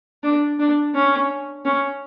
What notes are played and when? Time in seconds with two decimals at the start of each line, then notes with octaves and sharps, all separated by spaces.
0.24 D4
0.59 D4
0.95 C#4
1.65 C#4